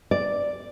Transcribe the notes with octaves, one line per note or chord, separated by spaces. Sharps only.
D5